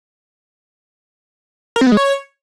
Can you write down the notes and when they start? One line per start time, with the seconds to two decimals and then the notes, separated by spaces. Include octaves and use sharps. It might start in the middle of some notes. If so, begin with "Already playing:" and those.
1.76 A#4
1.81 C4
1.87 B3
1.92 G#3
1.97 C#5